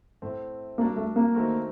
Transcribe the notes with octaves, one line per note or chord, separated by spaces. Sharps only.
A2 A3 C4
G3 A#3 D4 F#4 A#4
A3
A#3
D#3 A3 C4 F#4 A#4